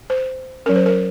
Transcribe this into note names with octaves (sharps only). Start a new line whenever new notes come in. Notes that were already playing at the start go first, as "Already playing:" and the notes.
C5
F#3 C#4 A#4
C5
A#4